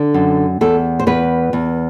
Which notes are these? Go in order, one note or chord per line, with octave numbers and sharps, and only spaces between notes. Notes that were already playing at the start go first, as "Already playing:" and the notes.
Already playing: D3
F#2
E2 A4
C5
E2 B4
E2